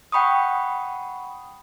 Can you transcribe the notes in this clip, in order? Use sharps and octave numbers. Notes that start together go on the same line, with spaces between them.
F#5 G5 B5 C#6 D#6